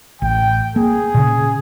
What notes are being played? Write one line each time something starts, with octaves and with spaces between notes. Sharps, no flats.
A1 G5
A#3 G#4
A#2 C#3